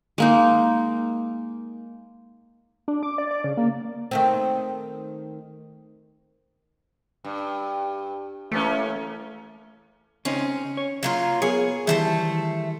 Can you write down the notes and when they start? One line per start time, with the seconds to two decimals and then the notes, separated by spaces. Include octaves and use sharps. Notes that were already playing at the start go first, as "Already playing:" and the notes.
0.18 G#3 A#3 D#4
2.88 D4
3.03 D6
3.18 D5
3.31 D5
3.44 C#3
3.57 A#3
4.11 D#3 A3 C4
7.24 G2
8.52 E3 A3 A#3 C#4
10.25 C#3 C4 C#4 D#4
10.77 C#5
11.03 F#3 A#3 F4
11.42 B3 G#4 A#4 C#5
11.87 D#3 E3 G3 A3 C5 A5